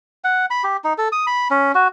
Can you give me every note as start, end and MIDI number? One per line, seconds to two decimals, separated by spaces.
0.24 0.46 78
0.50 0.64 83
0.64 0.77 67
0.84 0.93 63
0.98 1.08 69
1.12 1.26 87
1.27 1.48 83
1.51 1.72 61
1.75 1.88 66